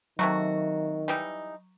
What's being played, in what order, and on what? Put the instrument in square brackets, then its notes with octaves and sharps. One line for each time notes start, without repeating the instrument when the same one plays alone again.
[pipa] C3 A3 F#4 [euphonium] D#3 [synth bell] F#3 A#5 C#6
[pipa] E3 G3 D#4